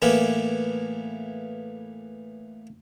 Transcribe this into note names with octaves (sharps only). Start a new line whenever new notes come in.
A2 E3 A#3 B3 G4